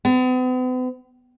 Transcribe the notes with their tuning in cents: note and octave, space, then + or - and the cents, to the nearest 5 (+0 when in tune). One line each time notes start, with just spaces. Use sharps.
B3 +45